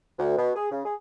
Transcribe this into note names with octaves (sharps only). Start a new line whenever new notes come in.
D2
B2
G#4
C#3
G#4